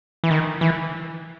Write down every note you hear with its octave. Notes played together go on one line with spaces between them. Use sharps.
E3
D#3
E3